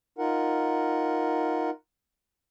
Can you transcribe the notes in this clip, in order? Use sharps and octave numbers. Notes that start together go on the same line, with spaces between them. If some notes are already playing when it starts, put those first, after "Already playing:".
D#4 F4 A#4 F#5